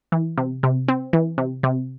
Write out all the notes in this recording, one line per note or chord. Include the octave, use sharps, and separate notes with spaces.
E3
C3
C3
C4
E3
C3
C3